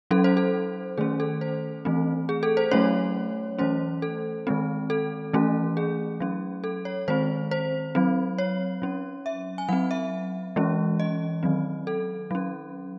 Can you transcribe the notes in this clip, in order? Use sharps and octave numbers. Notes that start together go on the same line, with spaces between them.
F#3 C#4 A4
C5
A4
D#3 A3 C#4 G#4
A4
C5
E3 A3 C4
G#4
A4
C5
F#3 A3 C#4 C#5
E3 A3 C#4 C5
A4
D#3 G#3 C4
A4
E3 A3 C#4
G#4
F#3 C#4
A4
C#5
D#3 G#3 C4 C5
C5
F#3 C4
C#5
F#3 C#4
E5
G#5
F#3 C4 F#5
E5
E3 G#3 C#4
D#5
D#3 F#3 C4
A4
F#3 C#4